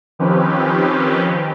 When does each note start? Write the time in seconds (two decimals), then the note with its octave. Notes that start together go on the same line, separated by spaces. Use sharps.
0.19 D#3 F3 C4 C#4 G4 B4